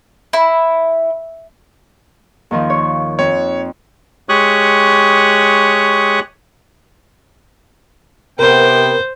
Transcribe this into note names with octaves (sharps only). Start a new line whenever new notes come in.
E4
D#2 D#3 F3
C#5
F2 C#5
G#3 G4 C#5 C#6 D#6 F#6
C3 B3 A#4 C5 G5